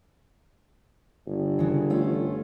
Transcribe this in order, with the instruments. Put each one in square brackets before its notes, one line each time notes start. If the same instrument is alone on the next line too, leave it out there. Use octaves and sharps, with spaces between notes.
[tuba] G1
[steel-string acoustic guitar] C#3 E3
A3 C#4 F4